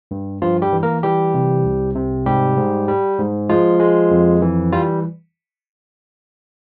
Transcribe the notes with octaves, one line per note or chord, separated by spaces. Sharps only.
G2
G2 F3 F4
G3 G4
E3
A#3 A#4
E3 G3 G4
C3
C2
C3
G#2 G3 G4
G#2
G3
G#2
F3 G#3 F4
G#3
F2
E3
G3 F4